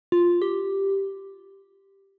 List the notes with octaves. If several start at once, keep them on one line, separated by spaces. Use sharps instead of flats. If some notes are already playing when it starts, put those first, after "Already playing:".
F4
G4